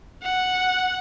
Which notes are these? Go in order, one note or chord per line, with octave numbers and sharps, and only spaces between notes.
F#5